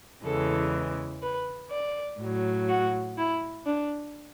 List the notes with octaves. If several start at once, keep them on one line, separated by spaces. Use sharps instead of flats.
E2 C#3 E3 G#3 A4
B4
D5
A2 F#3
F#4
E4
D4